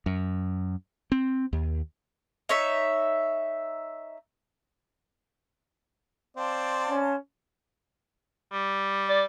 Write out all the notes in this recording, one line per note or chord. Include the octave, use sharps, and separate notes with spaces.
F#2
C4
D#2
D#4 C#5 E5
C4 D5 F5 A5 C6
C#4
G3
D5